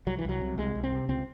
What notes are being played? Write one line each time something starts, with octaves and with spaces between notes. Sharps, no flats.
C2 F#3
E3
C2 F#3
C3
C2 G#3
C2
C4
C3
C#2 C4